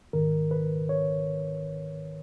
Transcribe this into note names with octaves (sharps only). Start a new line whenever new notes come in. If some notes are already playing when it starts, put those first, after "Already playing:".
G#2 D#3 A#4
B4
C#5